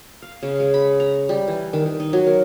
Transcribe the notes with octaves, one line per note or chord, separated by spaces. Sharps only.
F5
C#3
G#3
B5
A#5
G3
E3
D#3
D#3
D#4
F#3
A#4